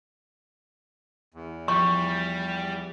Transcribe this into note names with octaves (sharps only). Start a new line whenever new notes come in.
E2
F3 G3 C#6 B6